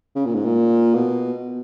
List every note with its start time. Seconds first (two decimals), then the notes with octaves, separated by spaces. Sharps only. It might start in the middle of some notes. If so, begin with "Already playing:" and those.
0.15 C#3
0.25 A#2
0.35 G#2
0.45 A#2
0.94 B2